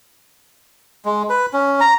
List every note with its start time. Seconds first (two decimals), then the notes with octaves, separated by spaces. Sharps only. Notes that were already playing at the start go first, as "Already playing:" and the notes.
1.05 G#3
1.29 B4
1.53 C#4
1.80 A#5